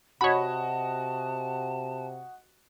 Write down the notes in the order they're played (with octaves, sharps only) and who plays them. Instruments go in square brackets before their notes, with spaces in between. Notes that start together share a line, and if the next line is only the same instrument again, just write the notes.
[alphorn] C3 [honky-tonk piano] F#4 D#5 [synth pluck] C#5 B5 [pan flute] A5